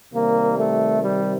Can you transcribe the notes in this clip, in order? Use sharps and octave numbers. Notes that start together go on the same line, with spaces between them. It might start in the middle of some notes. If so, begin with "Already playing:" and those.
C3 D#3 G3 A#3
A3
G3